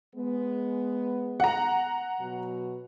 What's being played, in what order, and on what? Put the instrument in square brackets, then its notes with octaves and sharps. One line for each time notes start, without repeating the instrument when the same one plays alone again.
[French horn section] G#3 B3
[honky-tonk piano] F#5 A#5
[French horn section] B2 F#3